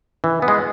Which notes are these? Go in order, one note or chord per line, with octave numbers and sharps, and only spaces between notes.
E3
B3
G#3